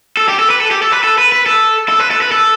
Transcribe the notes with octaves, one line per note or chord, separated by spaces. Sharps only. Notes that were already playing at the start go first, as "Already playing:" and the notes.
A4
G4
A4
B4
A4
G4
A4
B4
A4
B4
B4
A4
A4
B4
A4
B4
A4